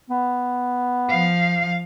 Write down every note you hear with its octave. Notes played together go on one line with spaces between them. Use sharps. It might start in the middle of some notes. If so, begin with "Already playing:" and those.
B3
F3 F5